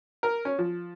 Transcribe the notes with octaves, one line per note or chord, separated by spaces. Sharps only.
A#4
C#4
F3